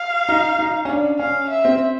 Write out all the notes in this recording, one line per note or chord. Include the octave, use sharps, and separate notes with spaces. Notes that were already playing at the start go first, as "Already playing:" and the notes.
Already playing: F5
D#4
D#4
C#4
D4
C#4 F5
E5
C4